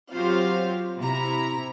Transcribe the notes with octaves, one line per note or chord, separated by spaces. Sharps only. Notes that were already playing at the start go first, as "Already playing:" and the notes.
F#3 C4 F4 G4 C5 F5
C3 E4 A#5